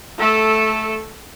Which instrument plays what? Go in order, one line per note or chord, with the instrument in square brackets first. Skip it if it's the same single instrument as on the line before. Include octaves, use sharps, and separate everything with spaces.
[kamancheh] A3 A4